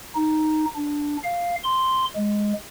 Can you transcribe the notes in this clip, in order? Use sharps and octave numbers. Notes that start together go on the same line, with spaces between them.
D#4
D4
F5
C6
G#3